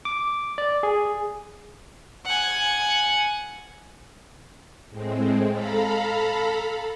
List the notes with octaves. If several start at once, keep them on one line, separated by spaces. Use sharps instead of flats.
D6
D5
G#4
F#5 G#5
A2 G#3 C4
A4 F5 A#5 B5